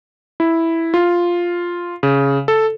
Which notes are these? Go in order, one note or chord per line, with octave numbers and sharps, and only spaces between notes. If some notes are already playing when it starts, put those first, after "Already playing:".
E4
F4
C#3
A4